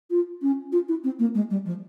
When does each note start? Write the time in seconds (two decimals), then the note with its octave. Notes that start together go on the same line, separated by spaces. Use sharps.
0.10 F4
0.42 C#4
0.72 F4
0.88 E4
1.04 C4
1.19 A#3
1.34 G#3
1.50 G3
1.65 F3